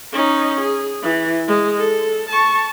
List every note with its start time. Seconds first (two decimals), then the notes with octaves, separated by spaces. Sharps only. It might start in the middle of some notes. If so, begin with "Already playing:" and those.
0.12 C#4 D#4
0.61 G#4
1.02 E3
1.48 G#3
1.78 A4
2.29 A5 C#6